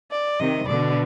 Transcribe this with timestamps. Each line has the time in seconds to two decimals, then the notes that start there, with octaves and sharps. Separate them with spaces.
0.11 D5
0.40 C3 D#3 D#5
0.67 B2 D3 D5